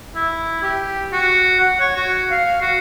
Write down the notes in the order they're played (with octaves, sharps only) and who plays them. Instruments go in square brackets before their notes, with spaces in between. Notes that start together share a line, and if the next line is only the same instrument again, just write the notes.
[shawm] E4
G4
F#4
F#5
C#5
F#4
F5
F#4